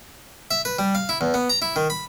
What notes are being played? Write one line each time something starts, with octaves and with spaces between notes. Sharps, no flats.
E5
B4
G3
F5
E4
E2
B3
A#5
E4
D#3
B5